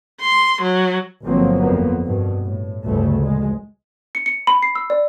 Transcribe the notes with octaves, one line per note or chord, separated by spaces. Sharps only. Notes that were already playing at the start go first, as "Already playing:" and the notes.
C6
F#3
G1 B2 F3 F#3 A#3 C4
F2 A#3 B3
G2 B2
A2
G1 D2 C#3 A3
A#1 G#3
C#7
C#7
B5
C7
E6
D5